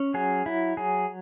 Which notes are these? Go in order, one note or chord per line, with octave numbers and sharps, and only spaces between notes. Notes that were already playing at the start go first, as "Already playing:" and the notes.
Already playing: C#4
F#3 G#4
F#3 E4
F#3 G#4